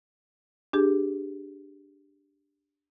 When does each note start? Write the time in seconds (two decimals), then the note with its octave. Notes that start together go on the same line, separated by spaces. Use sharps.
0.73 D4 G4 G#4